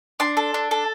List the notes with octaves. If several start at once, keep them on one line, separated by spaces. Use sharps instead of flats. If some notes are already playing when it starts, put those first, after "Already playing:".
D4 C6
A4
D4
A4